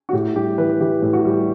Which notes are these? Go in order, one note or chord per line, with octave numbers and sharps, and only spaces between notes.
F#4
A2 G4
G3 G4
E3 B4
E3 G4
A2
F#4
G3